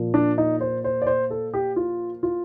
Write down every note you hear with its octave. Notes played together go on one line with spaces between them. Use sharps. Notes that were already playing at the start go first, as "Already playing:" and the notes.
Already playing: A#2 F3
D4
D#4
C5
C5
D5
C5
A4
G4
F4
F4